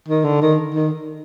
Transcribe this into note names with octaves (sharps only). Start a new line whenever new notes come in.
D#3
D3
D#3
D#3